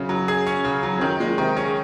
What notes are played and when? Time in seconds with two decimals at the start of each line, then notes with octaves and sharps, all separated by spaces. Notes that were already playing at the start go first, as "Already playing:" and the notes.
Already playing: F#2 C#3
0.09 F#3
0.28 G#4
0.47 C#4
0.65 C#3
0.83 F#3
0.98 F2
1.01 F#2 D#3
1.20 A#2 G#3
1.38 C3 D#3
1.57 C#3 C#4